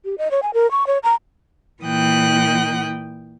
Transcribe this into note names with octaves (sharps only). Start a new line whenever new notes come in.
G4
D#5
C#5
G#5
A#4
C#6
C#5
A#5
A#2 E3 G5 D#6 F#6